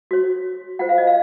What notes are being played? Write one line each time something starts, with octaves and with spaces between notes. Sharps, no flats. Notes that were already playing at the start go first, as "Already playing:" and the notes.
F#4 C#5
F4 C5 F#5
F5
D#5
F5